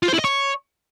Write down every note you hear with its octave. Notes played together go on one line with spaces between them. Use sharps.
F4
C5
E4
D#5
C#5